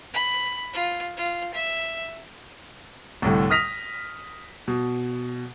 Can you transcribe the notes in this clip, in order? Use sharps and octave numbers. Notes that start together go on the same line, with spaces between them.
B5
F4
F4
E5
C2 A2 D3
D#6 F6 A#6 B6 F7
B2